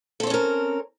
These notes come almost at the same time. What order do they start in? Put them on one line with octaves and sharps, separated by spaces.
A4 C4 C#5 C#4 A#4